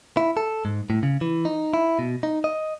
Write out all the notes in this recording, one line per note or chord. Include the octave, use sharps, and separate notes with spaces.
E4
A4
G#2
A2
C#3
E3
D#4
E4
B2
D#4
D#5